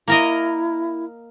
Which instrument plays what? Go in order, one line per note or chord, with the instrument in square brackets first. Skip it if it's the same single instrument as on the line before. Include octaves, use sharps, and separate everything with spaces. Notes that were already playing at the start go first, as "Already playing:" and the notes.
[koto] A#3 A#4 D#5 [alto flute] E4